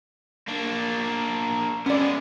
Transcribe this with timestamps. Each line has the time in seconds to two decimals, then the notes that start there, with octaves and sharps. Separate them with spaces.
0.48 A#3 D4
1.86 G#3 B3 C#4 D5